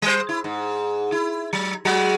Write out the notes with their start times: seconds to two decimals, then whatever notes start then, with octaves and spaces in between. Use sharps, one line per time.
0.02 G3 C5
0.29 E4
0.44 G#2
1.12 E4
1.53 F#3
1.85 F#3 G#3 F#4